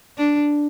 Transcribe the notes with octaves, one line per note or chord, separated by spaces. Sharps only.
D4